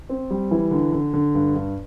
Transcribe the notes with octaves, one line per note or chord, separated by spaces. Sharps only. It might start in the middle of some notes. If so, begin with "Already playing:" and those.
C4
G3
E3
D3
D3
D3
G2
G2